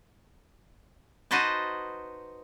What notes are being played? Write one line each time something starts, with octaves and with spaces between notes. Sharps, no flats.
D#4 F#4 B4 C5 D#5 A5